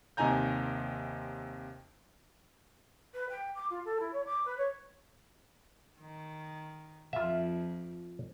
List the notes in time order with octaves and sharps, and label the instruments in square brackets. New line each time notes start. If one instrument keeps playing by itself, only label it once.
[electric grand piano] D#2 C3 D#4 G#5 A#5 G6
[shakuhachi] B4
G5
D6
F4
A4
E4
C#5
D6
B4
C#5
[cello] D#3
[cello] F2 [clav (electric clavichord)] F4 E5